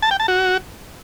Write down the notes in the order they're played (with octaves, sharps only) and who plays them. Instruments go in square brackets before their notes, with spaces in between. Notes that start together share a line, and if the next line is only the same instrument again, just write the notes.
[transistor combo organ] A5
G5
A5
F#4